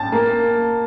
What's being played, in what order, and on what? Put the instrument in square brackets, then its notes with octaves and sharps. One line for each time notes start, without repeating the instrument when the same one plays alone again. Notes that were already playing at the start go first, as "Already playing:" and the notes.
Already playing: [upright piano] A5 A6
A#3